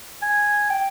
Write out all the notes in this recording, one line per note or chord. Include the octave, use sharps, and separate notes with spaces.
G#5
G5